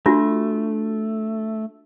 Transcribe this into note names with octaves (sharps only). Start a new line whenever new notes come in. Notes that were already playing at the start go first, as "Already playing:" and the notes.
A3 D4 F4 F#4